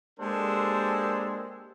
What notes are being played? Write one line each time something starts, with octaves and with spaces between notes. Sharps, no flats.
G#3 A#3 D4 G4 A4 C5